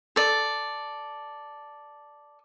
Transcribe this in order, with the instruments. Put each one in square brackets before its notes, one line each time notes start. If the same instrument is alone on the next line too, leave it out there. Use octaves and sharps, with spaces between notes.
[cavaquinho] A4 D5